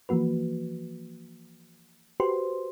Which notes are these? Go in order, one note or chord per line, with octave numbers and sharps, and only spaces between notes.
E3 F3 A#3 F#4 B4
F#4 G4 B4 C5 C6